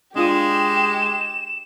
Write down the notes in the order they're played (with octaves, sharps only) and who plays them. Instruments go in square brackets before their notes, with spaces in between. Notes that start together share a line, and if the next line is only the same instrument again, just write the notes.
[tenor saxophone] G#3 [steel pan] D4 F4 D#6 [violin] G4 [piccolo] E7